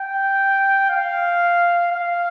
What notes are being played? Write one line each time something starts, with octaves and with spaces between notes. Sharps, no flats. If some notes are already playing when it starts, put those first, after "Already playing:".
Already playing: G5
F5
F5